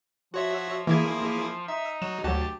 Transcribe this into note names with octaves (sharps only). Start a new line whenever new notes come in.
F3 F#4 C#5 E5
E3 A#3 E4 G#4 G#6
D#4 E5
F#3 E7
D2 F#3 F#4 G4 A5